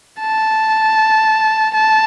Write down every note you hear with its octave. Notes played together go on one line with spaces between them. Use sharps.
A5
A5